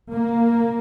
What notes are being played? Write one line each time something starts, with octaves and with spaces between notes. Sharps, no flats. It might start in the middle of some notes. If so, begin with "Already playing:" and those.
A#3